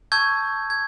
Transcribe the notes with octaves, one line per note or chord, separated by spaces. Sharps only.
A5 C#6 E6 G6 G#6
G#6